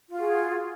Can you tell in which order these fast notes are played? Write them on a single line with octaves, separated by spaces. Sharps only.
F4 F#4 G#4